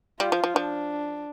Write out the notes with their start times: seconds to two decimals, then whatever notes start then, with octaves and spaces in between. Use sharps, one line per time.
0.20 G3 F4
0.32 F3
0.44 F3
0.55 F3 D4